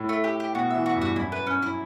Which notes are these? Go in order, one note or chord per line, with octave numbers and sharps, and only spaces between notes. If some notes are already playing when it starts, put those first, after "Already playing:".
Already playing: A2
A3
G4
G4
B2 F#4
E3 E5
F#4
G2
F#4
F#2 E4
B4
C#4
E4